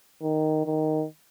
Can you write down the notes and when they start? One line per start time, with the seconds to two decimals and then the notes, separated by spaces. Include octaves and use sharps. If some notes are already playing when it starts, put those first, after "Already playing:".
0.22 D#3
0.65 D#3